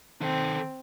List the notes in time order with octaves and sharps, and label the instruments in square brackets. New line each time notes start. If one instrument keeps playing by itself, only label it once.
[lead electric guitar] D#3 A4 [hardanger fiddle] C4